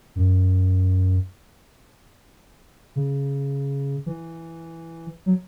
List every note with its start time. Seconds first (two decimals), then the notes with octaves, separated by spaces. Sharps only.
0.16 F#2
2.96 C#3
4.06 E3
5.26 F#3